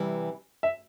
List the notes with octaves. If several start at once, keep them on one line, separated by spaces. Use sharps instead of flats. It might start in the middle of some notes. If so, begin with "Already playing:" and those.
Already playing: C3 E3 G3
E5